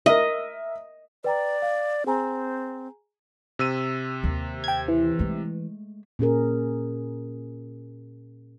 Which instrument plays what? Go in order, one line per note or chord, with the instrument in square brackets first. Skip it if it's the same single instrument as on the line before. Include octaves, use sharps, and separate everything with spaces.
[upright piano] A#4 E5 [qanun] D#5
[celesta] B4 G5 A#5 [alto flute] D5
[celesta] F5
[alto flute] C4 [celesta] G#4 G#5 A#5
[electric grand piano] C3 E6 D#7
[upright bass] D#2
[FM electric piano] G5 G#6
E3
[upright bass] G#3 A3
[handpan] A#2 C#4 G#4 A#4